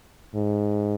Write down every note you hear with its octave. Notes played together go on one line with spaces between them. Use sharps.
G#2